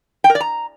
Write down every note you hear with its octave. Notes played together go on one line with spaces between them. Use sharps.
G5
A#4
D5
A#5